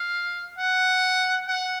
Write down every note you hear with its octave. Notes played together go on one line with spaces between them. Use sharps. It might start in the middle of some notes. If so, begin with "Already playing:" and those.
Already playing: F5
F#5
F#5